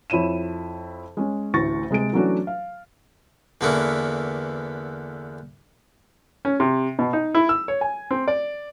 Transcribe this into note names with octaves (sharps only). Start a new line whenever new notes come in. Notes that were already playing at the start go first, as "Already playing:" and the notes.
F2 E4 C#5 D#7 E7
G#3 C#4
A1 D2 A2 C#6 A6 A#6
C3 G#3 G#4 D7
E3 F#3 A3 C#4 D4 F#4
F5
E2 D3 A#3 B3 C#4 E4
C#4
C3
B2
D#4
E4
E6
C#5
G#5
C4
D5